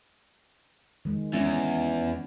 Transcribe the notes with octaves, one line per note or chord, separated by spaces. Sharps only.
D#3 G#3
E2 G#3 C#4